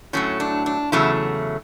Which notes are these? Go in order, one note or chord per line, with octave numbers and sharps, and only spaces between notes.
A2 F#3 A3 C#4
D4
D4
E2 C#3 F#3 A3 E4